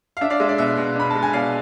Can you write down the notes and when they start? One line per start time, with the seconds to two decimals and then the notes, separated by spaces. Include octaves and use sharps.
0.17 F5
0.21 D4 E5
0.30 D5 F5
0.40 G#3 E5
0.49 D5
0.58 B2 E5
0.77 B2
0.96 D4 B5
1.10 G#3 A5
1.23 G#5
1.33 B2 D5 F5